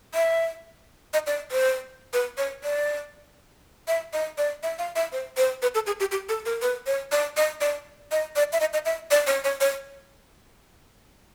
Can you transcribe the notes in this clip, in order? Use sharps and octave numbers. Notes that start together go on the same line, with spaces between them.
E5
D#5
D5
C5
B4
C#5
D5
E5
D#5
D5
E5
F5
E5
C5
C5
B4
A4
G#4
G4
G4
A4
A#4
B4
C#5
D5
D#5
D5
D#5
D5
E5
D#5
D#5
E5
D5
C#5
C#5
C#5